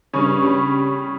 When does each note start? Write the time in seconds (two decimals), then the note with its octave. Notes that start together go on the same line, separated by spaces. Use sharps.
0.13 G2 C#3 C#4
0.42 G3